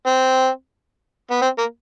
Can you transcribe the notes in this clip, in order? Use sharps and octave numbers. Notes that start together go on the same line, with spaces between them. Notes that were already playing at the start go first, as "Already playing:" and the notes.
C4
B3
C4
A#3